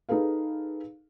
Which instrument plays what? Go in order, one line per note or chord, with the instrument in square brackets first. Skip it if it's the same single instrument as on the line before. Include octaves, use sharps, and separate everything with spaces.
[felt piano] D#4 G#4 A4 B4 F5